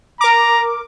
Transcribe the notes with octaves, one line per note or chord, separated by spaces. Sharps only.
A#4 A#5 D6